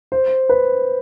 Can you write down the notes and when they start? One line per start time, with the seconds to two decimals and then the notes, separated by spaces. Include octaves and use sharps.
0.12 C5
0.49 B4